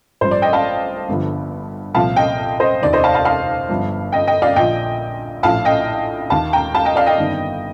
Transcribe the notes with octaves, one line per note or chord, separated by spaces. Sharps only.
A1 G2 F3 C5
D5
D#5 G5
F5 A5
G1 G2 D3 F3
C2 A#2 F3 F5 A5
D#5 G5
C5 D#5
F1 D#2 D#3 D5
C5 D#5
F5 A5
F5 A5
F5 A5
G1 G2 F3
D#5 G5
D#5 G5
D5 F5
A#1 A#2 F3 D#5 G5
A#1 A2 F3 F5 A5
D#5 G5
D#2 D#3 F5 A5
G5 A#5
F5 A5
D#5 G5
D5 F5
D#5 G5
G1 F2 D#3